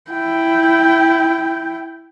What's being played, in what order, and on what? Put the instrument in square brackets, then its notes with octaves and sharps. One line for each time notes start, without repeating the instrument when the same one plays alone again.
[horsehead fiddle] E4 G5